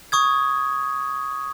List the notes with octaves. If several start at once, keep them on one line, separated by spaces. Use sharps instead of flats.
C#6 D#6 G#6